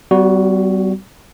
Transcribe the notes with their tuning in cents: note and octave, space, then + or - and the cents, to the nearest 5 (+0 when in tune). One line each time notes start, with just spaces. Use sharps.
G3 -30 B3 +40 F#4 +0